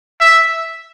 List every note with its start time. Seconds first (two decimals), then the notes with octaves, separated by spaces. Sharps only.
0.20 E5